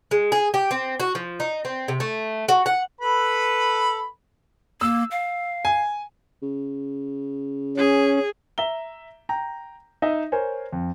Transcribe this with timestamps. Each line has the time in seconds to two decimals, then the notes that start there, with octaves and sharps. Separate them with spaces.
0.11 G#3
0.32 G#4
0.54 G4
0.71 C4
1.00 F#4
1.15 F3
1.40 D#4
1.65 C4
1.88 C3
2.00 A3
2.49 F#4
2.66 F#5
3.01 A4 B4 B5
4.81 A#3 E6
5.11 F5
5.65 G#5
6.42 C#3
7.77 C#4 G#4
8.58 E5 A#5 G7
9.29 G5 A#5
10.02 D#4 D#5 E5
10.32 A#4 C5 C#5 G#5
10.73 F2